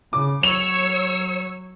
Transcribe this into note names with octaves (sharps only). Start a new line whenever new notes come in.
C#3 D6
F#3 C#5 E6 C#7 F7